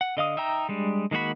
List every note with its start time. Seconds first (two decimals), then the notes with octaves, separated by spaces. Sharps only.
0.01 F#5
0.17 D3 D#5 F5 D#6
0.37 D#4 E5 G5 A#5
0.69 G3 G#3 D4
1.11 D#3 G#3 A#3 F#4 B5